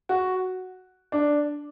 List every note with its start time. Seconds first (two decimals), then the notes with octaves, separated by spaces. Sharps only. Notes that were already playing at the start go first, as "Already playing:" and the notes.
0.09 F#4
1.12 D4